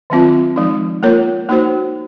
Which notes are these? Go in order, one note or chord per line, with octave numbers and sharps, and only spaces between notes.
D#3 F#3 C4 F4
F3 G#3 D#4
A#3 F4 A#4 C#5
A#3 D#4 F#4 C5